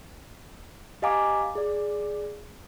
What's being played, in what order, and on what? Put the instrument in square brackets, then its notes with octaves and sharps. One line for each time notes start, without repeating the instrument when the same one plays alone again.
[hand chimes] G4 D#5 F5 G#5 A#5 D6
G#4 D5